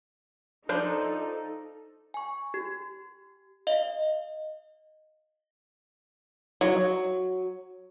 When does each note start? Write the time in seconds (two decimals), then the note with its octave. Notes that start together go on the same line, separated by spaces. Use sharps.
0.69 F3 D4 D#4 A4 C5
2.14 G#5 C#6
2.54 G4
3.67 D#5 F5
6.61 F#3